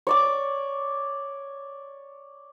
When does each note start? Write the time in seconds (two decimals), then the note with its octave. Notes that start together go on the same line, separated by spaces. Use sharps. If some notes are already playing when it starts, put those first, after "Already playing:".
0.07 C#5 D5 D6